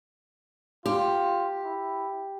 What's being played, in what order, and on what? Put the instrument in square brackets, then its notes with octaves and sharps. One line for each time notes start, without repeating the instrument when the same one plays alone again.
[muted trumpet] F4 [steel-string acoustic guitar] G4
[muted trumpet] E4